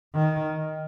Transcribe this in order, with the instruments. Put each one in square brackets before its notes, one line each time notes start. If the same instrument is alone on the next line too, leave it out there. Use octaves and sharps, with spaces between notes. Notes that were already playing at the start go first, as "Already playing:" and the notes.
[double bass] D#3